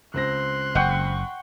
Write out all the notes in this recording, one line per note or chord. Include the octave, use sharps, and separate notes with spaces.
C#2 C4 C6 F#6 A#6
F#1 F#5 G5 C#6